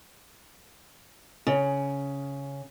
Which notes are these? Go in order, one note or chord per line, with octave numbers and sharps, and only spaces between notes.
C#3